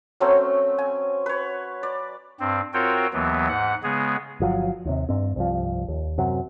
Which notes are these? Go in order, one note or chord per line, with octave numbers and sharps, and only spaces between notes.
F#3 A3 C4 C#4
G#5
B4 C#5
D5
G2 C4
C4 F4 F#4 A#4 C#5 G5
D#2 E3 F#3 B3
G#2 F#5
C#3 G#3 B3 G#4
G1 F3 F#3
D#2 C3
G2 C4
C2 G2 F3
D#2
F#2 C3 F#3